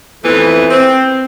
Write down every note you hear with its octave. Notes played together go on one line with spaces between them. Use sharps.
F2 E3 A3 B3
C4